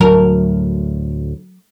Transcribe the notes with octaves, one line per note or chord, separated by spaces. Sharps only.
D2 A2 F#3 A#4